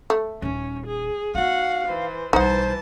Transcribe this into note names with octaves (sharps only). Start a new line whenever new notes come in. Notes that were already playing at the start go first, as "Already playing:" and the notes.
A3
D#1 C#4 D#4
G#4
B3 D#4 F#4 F5 F#5
E3 C5
B1 E3 G3 D#4 C5 F#5 A5